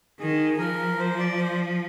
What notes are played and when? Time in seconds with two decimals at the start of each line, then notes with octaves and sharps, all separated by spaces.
0.20 D#3 G#4
0.59 F3 A#4
0.99 C5
1.19 D5
1.38 C5